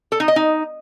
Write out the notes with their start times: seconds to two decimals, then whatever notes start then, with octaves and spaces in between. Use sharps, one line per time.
0.12 A4
0.20 D#4
0.28 D#5
0.36 D#4